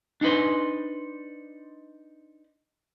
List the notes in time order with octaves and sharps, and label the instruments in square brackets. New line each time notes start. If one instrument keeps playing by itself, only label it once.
[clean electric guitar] D4 D#4 F#4 B4 C5